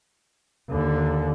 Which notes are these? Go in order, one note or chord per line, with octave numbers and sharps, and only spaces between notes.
D#2 D3